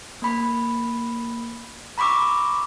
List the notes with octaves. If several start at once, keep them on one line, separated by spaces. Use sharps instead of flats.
A#3 B5
A#5 B5 C#6 D6 E6